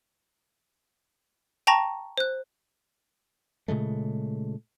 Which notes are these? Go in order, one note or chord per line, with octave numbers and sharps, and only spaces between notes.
G5 A5 A#5 C#6 A#6 F7
C5 F#6
A#2 C#3 G#3 A3